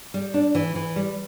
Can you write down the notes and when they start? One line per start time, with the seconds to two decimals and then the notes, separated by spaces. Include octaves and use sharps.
0.14 G3
0.34 D4
0.55 E3
0.75 E3
0.96 G3